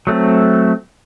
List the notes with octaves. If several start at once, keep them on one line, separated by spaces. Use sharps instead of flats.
F#3 A3 C4